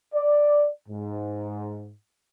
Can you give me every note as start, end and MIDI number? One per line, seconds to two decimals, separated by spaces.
0.14 0.69 74
0.89 1.92 44